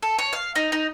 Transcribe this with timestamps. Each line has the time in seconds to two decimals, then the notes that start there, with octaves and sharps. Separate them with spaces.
0.02 A4
0.19 C#5
0.33 F5
0.55 D#4
0.72 D#4